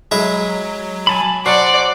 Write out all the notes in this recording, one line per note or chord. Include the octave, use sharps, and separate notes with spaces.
F#3 G#3 E4 G#4
G#5 A5 B5
F#3 C5 D5 F#5